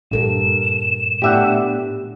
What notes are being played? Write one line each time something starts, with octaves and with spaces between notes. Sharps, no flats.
G2 A#2 A4 A#4 E7
A2 B3 D4 G4 E5 F#5